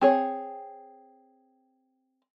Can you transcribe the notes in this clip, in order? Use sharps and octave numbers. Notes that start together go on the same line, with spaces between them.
C4 G#4 C#5